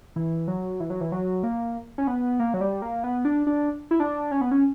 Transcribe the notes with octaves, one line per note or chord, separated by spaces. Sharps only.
E3
F#3
E3
F#3
E3
F#3
A#3
C#4
B3
A#3
F#3
G3
A#3
B3
D4
D4
E4
D4
C#4
B3
C#4